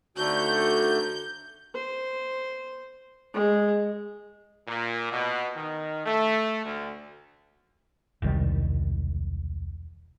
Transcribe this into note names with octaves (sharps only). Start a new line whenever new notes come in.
D3 A3 C4 D#4 F#4 G6
C5
G#3
A#2
B2
D#3
A3
D2
E1 C2 D#3 G3